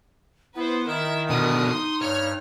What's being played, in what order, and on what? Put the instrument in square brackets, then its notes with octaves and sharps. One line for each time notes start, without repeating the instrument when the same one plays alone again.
[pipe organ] B3 [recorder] E4 [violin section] B4 C5
[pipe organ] D#3 [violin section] E4 E5 [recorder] A#4
[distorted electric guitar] B2 D3 [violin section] D#6
[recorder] D#4 [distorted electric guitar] C6
[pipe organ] G2 [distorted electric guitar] C#5 [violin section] F6